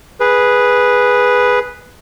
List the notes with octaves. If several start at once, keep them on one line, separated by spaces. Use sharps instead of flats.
G#4 B4